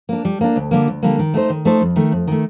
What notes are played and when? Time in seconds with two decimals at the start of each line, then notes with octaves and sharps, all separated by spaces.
0.09 A#3 D4
0.25 G3
0.41 A#3 D4
0.56 D2
0.71 D3 G3 A#3
0.88 D2
1.03 D3 G3 A#3
1.19 D#3
1.34 A3 D#4 A4 C5
1.50 D#3
1.65 A3 D#4 A4 C5
1.81 F2
1.96 D#3 A3
2.12 F2
2.27 D#3 A3